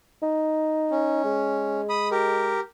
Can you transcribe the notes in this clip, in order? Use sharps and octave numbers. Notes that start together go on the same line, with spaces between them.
D#4
C#4
G#3
B5 D#6
G4 A#4